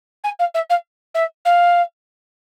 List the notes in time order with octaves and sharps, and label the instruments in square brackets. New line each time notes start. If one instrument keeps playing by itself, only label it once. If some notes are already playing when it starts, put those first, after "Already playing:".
[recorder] G#5
F5
E5
F5
E5
F5